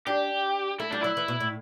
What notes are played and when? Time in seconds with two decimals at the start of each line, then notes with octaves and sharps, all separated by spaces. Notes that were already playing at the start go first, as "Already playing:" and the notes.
0.07 D4 G4
0.80 A3 E4
0.91 G3 D4
1.02 F#3 E4
1.17 E3
1.28 B2
1.40 A2